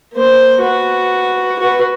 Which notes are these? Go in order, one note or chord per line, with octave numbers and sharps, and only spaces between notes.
A#3 C5
F#4 B4
F#4 B4